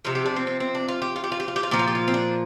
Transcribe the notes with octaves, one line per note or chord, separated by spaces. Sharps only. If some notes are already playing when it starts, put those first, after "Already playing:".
C3 F3 F4
G4
D4
C4
C4
C4
D4
F4
G4
F4
G4
F4
G4
F4
G4
F4
A#2 F3 G4
F4
G4
F4
C4
D4